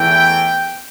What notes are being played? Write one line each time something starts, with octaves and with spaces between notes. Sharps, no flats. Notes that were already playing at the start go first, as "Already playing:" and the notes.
Already playing: E2 E3 A3 G5